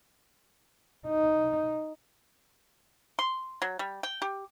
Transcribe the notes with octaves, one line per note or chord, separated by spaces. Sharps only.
D#4
C6
F#3
G3
G5
G4